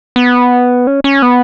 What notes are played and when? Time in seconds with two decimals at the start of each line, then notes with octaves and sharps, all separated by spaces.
0.16 B3
0.87 C#4
1.04 C#4
1.22 B3